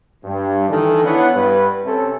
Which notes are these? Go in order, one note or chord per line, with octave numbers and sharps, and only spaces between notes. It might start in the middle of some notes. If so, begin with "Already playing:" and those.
G2
D#3 E3 A4
B3 D4 E4 B4 C#5 F#5
G2 B4
C3 C#4 A4